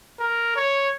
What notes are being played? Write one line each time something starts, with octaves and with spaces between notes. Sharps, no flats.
A#4
C#5